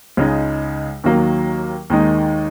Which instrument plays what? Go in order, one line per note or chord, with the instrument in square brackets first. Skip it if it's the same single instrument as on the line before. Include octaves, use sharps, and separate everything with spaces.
[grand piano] C#2 C#3 G#3 D#4
D#2 D#3 F#3 A#3
D#2 D#3 G#3 D#4